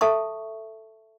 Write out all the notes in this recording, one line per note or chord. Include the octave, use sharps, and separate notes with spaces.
A4 E5 A5 C#6